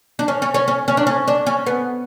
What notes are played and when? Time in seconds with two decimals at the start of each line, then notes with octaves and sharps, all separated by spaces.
0.19 D4
0.28 C#4
0.42 C#4
0.54 C#4
0.68 C#4
0.88 C#4
0.97 D4
1.07 C#4
1.28 D4
1.47 C#4
1.66 B3